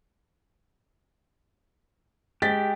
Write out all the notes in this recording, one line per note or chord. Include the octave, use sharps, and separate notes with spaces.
G#3 G4 A6 B6